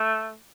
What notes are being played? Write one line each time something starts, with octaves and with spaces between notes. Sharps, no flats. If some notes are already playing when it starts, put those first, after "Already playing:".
Already playing: A3